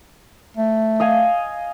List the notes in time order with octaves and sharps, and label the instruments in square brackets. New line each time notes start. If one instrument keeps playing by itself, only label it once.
[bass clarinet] A3
[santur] D#5 F5 G#5